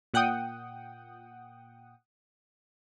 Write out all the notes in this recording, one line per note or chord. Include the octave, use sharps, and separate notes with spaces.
A#2 F#5 G5 D#6